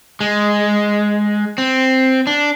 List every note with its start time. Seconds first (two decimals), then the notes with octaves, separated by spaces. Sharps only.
0.21 G#3
1.58 C4
2.27 D4